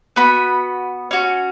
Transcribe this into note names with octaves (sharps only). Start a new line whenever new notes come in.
B3 F#4 B5
C#4 F#4